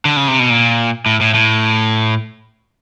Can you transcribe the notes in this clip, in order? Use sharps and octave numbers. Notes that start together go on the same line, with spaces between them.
D3
C#3
C3
B2
A#2
A2
A2
A2